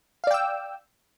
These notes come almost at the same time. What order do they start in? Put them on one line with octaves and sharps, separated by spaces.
F5 D5 G5 E6